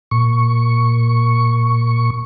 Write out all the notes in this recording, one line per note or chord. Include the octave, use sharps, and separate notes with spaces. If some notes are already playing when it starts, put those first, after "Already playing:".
A#2 C#6